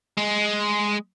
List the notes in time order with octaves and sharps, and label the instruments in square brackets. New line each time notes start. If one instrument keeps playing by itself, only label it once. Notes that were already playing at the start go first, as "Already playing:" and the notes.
[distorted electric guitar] G#3